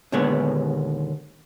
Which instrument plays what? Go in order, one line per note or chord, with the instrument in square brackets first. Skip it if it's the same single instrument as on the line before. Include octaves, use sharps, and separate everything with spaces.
[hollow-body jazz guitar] D#2 A#2 D3 G#3 B3 C#5